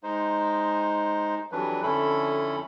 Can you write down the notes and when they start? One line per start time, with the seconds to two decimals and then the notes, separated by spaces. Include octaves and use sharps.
0.03 G#3 D#4 C5
1.52 F2 E3 F#3 G3 D4 B4
1.83 F2 D3 C#4 E4 A4 B5